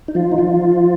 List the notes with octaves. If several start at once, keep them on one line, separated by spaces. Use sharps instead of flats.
D#4
F3 F4
D#4
F3 F4